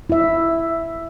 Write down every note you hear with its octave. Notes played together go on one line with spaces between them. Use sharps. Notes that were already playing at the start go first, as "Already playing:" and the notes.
E4 E5